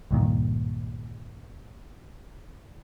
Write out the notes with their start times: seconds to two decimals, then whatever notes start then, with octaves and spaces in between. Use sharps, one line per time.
0.11 C#2 G2 A#2 D#3